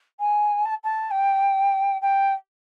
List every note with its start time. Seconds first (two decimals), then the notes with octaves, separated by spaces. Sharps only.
0.20 G#5
0.65 A5
0.84 A5
1.11 G5
2.02 G5